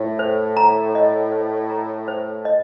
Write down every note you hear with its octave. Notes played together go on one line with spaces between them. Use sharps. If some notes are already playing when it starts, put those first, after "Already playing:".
Already playing: A2
C5
A#5
D#5
C5
A#5
C5
D#5